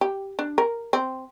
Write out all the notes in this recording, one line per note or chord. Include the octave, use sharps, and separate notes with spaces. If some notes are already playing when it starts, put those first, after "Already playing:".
G4
D4
A#4
C4